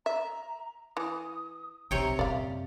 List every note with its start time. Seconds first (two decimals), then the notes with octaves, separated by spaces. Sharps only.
0.06 E5 A#5
0.97 E3 D#6
1.91 B1 C3 C#5 G5 A#5
2.19 F#2 A#2 D5 E5 F5